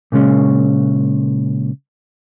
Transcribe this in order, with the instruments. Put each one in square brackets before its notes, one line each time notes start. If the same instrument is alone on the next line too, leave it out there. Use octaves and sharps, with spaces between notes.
[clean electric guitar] A#2 C#3 G#3 C#4